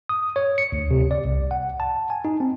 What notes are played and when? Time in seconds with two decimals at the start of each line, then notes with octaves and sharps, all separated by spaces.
0.09 D#6
0.36 C#5
0.58 C#7
0.72 D2
0.91 C3
1.11 D5
1.25 C2
1.51 F#5
1.80 A5
2.10 G#5
2.25 D#4
2.40 C4